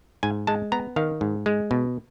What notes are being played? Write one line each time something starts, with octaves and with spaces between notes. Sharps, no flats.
G#2 G#5
G#3 A5
B3 A#5
D#3 F5
G#2
G#3
B2